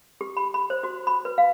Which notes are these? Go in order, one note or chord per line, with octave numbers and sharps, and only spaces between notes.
G4
B5
B5
C5
F#4
B5
B4
F5